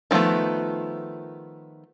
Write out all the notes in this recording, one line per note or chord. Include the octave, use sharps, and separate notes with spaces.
D#3 F3 G3 A3 B3